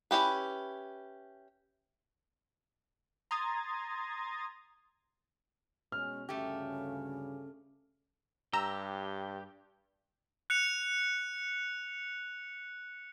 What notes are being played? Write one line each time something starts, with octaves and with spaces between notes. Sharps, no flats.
C#4 E4 G4 B4
A#5 C6 D#6 G#6 A6
B2 G#3 C#4 F6
D2 G2 C#3 A3 C#4 G4
G2 G4 A#5 E6
F#6 C#7 F7